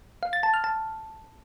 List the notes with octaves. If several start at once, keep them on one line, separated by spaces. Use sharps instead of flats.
F5
A6
A5
F6
A5